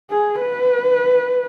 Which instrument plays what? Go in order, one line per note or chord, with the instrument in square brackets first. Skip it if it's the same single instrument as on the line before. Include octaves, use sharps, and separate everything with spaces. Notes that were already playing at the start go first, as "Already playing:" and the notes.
[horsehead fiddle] G#4
B4